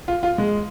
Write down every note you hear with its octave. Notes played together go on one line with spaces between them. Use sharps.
F4
F4
G#3